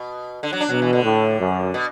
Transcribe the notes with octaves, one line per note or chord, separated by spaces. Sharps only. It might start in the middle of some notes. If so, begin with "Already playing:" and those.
Already playing: B2
D3
F#3
D4
B2 F#3
E3
D3
A2
F#2
B2